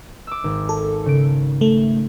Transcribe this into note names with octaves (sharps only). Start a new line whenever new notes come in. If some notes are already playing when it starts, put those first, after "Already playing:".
D6 E6
G#1
A4
C#3 D7
A3